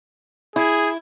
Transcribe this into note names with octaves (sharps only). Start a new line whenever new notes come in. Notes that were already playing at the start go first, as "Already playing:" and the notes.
E4 G#4